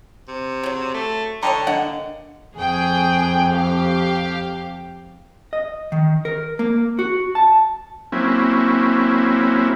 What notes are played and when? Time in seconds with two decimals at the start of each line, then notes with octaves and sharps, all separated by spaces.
0.28 C3
0.63 C#3 F#3
0.94 A3
1.43 D3 C#5 D#5 G5 A5 A#5
1.67 A#3 D4 D#5 F5 F#5
2.56 F2 G#4 G5
3.53 G4 F5
5.53 D#5
5.92 D#3
6.25 A#4
6.59 A#3
6.99 F#4
7.35 A5
8.12 F#3 A#3 C4 C#4 E4